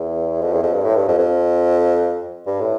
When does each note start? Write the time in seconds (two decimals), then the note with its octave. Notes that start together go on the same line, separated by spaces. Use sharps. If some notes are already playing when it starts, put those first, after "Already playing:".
Already playing: E2
0.41 F2
0.52 E2
0.63 F2
0.74 G2
0.85 A2
0.96 G2
1.08 F2
1.18 F2
2.47 G2
2.61 A2